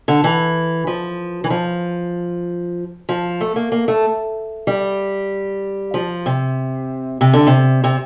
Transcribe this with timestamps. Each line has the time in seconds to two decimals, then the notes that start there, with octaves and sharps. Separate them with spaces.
0.08 D3
0.24 E3
0.87 F3
1.44 E3
1.50 F3
3.09 F3
3.41 A3
3.56 A#3
3.72 A#3
3.88 A3
4.67 G3
5.94 F3
6.26 C3
7.21 C3
7.33 D3
7.47 C3
7.84 C3